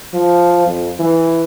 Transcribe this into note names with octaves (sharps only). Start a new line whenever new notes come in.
F3
F2
E3